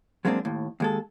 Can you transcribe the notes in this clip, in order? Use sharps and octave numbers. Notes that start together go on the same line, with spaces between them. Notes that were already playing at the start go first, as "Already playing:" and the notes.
F#3 G#3 A#3 C4 D4
D#2 A2
D#2 G#3 A4